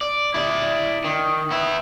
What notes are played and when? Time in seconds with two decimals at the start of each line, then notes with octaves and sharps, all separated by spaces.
0.01 D5
0.34 E4 D5
1.04 D#3
1.51 B3 E4